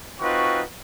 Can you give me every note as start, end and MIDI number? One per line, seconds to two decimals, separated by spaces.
0.20 0.63 60
0.20 0.63 63
0.20 0.63 65
0.20 0.63 66
0.20 0.63 71
0.20 0.63 85